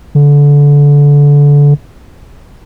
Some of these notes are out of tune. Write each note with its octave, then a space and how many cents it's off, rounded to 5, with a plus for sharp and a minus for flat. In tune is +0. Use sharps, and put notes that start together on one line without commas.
D3 -25